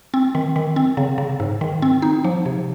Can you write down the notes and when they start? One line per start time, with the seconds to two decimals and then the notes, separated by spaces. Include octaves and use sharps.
0.14 C4
0.35 D#3
0.56 D#3
0.76 C4
0.97 C#3
1.18 C#3
1.40 G#2
1.61 D#3
1.82 C4
2.02 D#4
2.24 F3
2.46 C3